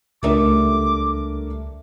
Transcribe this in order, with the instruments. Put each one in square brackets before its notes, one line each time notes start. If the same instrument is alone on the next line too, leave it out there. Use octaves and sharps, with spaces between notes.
[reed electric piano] C#2 [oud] G3 A3 D#5 [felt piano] D4 A#4 E5 [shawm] D6